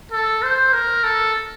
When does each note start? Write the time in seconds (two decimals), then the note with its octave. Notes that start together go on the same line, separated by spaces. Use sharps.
0.12 A4
0.43 C5
0.73 A#4
1.04 A4